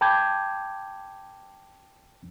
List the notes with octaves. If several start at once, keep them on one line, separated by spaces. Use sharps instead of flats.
G5 A5 B5 D6 G6 G#6